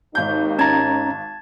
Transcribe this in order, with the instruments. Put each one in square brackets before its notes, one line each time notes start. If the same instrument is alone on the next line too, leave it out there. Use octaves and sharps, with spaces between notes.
[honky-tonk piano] G#1 G6 [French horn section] D#2 D#4
[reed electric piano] C#4 A#5 [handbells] A5 G#6 A6